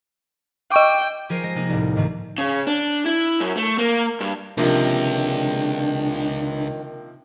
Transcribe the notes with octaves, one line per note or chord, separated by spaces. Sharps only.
D#5 G5 C#6 D6
F3 G#4 A#4 C5 C7 D#7
G#3 A#6
C3 A#3 D#4 G#4
C2 A2
G#2 D#3 A3 C4
C#3
D4
E4
F#2
A3
A#3
G2
C#2 C3 D#3 F3 A#3 D4